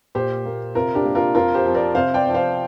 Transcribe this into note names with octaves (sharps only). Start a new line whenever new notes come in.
A#2 G4 C5
A#3
C3 F4 A#4
D4 G4
A#3
F4 A#4
F2 F4 A#4
G4 C5
F3 C4
A#4 D5
C3 C5 F5
D5 G5
F3 C4
C5 F5